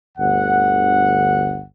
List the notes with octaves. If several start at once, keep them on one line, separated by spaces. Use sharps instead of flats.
G1 D2 F#5